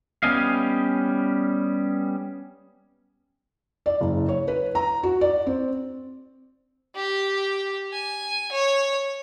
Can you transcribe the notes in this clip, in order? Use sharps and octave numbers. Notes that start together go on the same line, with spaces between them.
G3 B3 C#4 D#5 F5
D5
F#1
C#5
B4
A#5
F#4
D5
C4
G4
G#5
C#5